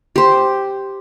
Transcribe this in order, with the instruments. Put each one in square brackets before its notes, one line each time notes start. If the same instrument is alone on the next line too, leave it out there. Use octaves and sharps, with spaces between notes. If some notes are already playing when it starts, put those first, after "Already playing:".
[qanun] G4 C5